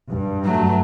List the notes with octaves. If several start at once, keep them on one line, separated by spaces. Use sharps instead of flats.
G2
F#3 A3